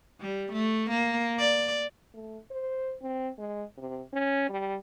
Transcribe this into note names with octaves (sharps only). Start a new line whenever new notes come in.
G3
A3
A#3
D5
A3
C5
C4
G#3
C3
C#4
G3